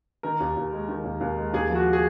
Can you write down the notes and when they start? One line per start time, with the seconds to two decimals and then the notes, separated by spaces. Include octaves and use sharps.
0.23 D#3 A#4
0.40 D#2
0.56 D#2
0.73 G#3
0.89 D#3
1.04 D#2
1.21 D#2
1.37 G#3
1.53 D#2 G#4
1.70 F3
1.75 F#4
1.93 G#4